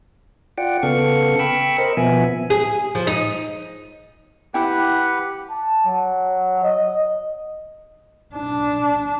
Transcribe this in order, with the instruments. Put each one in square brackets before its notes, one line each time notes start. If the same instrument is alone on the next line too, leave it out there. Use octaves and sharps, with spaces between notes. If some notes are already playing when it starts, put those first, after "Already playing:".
[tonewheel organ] F4 D5 F#5 G5
C#3 B3 A4 F5 C#6
G5 B5 C#6 E6
A#4 C5 D#5
B2 F3 B3 E5 G#5
[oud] G#4
F3
D#4
[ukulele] E4 G5 [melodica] G4 B4 F#5
[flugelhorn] A5
F#3
D#5
[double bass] D4